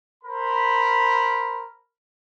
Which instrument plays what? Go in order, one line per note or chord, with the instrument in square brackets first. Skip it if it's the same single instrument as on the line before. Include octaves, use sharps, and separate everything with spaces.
[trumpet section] A#4 C5 B5